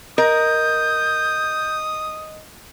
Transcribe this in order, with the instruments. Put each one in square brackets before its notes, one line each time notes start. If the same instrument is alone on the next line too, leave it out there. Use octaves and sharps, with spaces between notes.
[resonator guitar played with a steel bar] A#4 [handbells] D#5 [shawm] D#6 [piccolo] G6